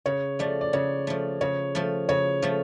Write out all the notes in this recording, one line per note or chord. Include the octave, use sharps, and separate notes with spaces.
C#3 C#5
F3 A3 D5
D5
C#3 C#5
F3 A3
C#3 C#5
F3 A3
C#3 C#5
F3 A3